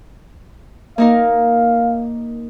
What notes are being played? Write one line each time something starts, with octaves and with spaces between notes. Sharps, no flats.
A#3 D#4 A#4 F5